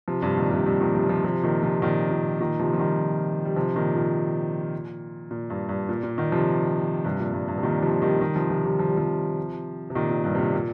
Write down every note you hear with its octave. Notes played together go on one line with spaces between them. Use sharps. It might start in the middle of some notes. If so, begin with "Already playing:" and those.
C3 F3
G2 C3
A#2 D#3
G2 C3
G2 C3
A#2 D#3
C3 F3
C3 F3
C3 F3
A#2 D#3
C3 F3
A#2 D#3
A#2
A#2 D#3
C3 F3
F3
D#3 G3
G3
C3 F3
A#2 D#3
A#2
A#2
G2
G2
A#2
A#2
A#2 D#3
C3 F3
G2 C3
A#2
G2
G2
C3
A#2 D#3
C3 F3
D#3 G3
D#3 G3
C3 F3
C3 F3
D#3 G3
F3
G3
C3 F3
C3
A#2 D#3
A#2
G2
C3
A#2
A#2